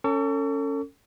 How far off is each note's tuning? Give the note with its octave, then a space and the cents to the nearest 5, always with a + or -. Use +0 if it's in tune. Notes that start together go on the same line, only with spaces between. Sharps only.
C#4 +0 A4 +35 C#6 +40